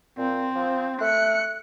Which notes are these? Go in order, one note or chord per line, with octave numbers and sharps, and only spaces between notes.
A#2 C4
F3
A3 F#6 C#7